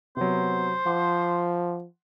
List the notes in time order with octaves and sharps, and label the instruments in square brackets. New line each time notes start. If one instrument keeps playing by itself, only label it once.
[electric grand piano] C3 F#3 [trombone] B3 [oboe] C5
[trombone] F3 [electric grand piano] F#5 C6 D6